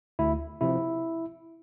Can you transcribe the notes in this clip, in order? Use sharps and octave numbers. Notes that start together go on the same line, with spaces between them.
D2 E4
C3 F3 E4